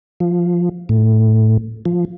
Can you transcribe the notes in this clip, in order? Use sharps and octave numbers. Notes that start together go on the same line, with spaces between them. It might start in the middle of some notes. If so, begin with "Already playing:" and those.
F3
A2
F3